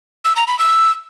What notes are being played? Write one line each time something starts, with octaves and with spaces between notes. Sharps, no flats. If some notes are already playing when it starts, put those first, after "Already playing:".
E6
A#5
B5
E6